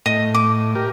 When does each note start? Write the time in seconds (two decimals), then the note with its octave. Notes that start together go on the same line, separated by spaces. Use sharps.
0.06 A2 D#5
0.34 D6
0.75 G4 A#4